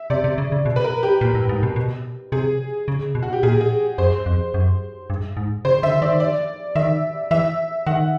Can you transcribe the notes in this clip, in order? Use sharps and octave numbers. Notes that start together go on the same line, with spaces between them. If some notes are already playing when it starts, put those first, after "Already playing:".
Already playing: E5
C3 D5
C3
C#3
C#3
B2
B4
A#4
G4
A#2
A2
G#2
B2
B2
C3 G#4
C#3
B2
F#4
G4
A#2 G#4
G#4
F#2 C5
F2
F#2
G2
G#2
C#3 C5
D3 E5
D#3 D5
D5
D#3 E5
E3 E5
D#3 F#5